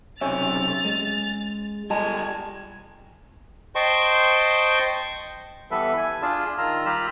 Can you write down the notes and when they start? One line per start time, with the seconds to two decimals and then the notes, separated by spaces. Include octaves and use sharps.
0.21 B1 C3 C#4 E5 A6 F7
0.85 G#3
1.90 G3 G#3 A5 A#5 G#6
3.75 C5 D#5 G5 A5 C6 C#6
5.71 E3 G3 B3 A4 B4 E5
5.97 G#5
6.22 D4 F4 G#4 A5
6.58 D#3 F4 A#5 E6
6.86 G3 F4 G4 A#5 B5 E6